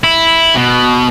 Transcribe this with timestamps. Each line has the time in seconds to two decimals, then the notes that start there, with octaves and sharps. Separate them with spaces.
0.04 E4
0.56 B2